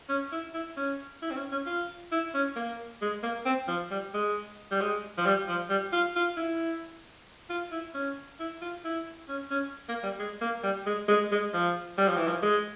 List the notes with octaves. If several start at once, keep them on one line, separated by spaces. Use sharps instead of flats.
C#4
E4
E4
C#4
E4
C4
C#4
C#4
F4
E4
C#4
A#3
G#3
A#3
C4
F3
G3
G#3
G3
G#3
F3
G3
F3
G3
F4
F4
E4
F4
E4
C#4
E4
F4
E4
C#4
C#4
A#3
G3
G#3
A#3
G3
G#3
G#3
G#3
F3
G3
F3
E3
F3
G#3